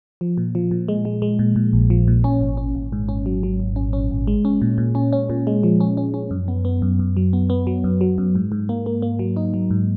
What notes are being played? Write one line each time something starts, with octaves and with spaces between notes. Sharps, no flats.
F3
A#2
F3
A#2
G#3
G#3
G#3
A#2
A#2
A#1
F3
A#2
C#4
G#1
C#4
G#1
G#2
C#4
F#3
F#3
G#1
C#4
C#4
G#1
G#3
C#4
A#2
A#2
C#4
C#4
A#2
G#3
F3
C#4
C#4
C#4
F#2
B3
B3
F#2
F#2
F#3
B3
B3
F#3
F#2
F#3
F#2
G#2
G#2
A#3
A#3
A#3
F#3
D#4
F#3
G#2